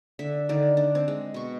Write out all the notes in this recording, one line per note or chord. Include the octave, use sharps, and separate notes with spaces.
D3 E5
D3 D#3 D5
D4
C4
G#3
B2 C#6